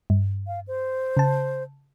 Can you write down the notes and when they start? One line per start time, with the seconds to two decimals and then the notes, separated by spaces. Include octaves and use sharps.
0.10 G2
0.47 F5
0.67 C5
1.17 C#3 A5